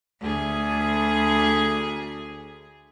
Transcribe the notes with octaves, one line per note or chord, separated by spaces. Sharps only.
D2 G#4